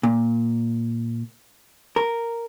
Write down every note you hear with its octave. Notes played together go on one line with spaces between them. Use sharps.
A#2
A#4